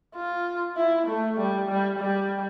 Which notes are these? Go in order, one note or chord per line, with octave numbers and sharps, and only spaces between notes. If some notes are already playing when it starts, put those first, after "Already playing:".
F4
E4
A3
G3
G3
G3